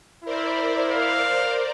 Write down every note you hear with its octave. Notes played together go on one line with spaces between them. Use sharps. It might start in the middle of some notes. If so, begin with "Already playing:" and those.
E4 A#4 C5 D5
F5